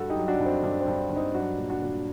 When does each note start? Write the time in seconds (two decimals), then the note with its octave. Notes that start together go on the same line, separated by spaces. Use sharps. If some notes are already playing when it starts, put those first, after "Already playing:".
Already playing: G2 F#4 A4
0.10 D#4 G4
0.16 F#3
0.28 D4 F#4
0.39 G2
0.46 C4
0.63 G2 D4
0.81 C4
0.88 G2
1.10 G2
1.16 C4 D#4
1.34 F#3 D4 F#4
1.58 A#2
1.70 D4 F#4
1.82 A#2